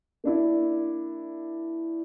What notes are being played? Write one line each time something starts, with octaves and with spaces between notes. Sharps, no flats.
A#3 D4 E4